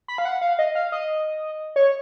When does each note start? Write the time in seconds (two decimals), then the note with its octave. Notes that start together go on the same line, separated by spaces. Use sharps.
0.08 B5
0.18 F5
0.25 F#5
0.41 F5
0.59 D#5
0.75 F5
0.92 D#5
1.76 C#5